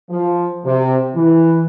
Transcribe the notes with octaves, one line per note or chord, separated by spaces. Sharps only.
F3
C3
E3